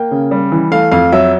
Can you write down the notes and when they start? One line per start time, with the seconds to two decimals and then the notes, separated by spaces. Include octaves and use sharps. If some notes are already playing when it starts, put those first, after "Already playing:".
Already playing: A#3 G5
0.11 C#3
0.31 G3
0.52 E3
0.72 A3 F5
0.91 F2 F5
1.12 F#3 E5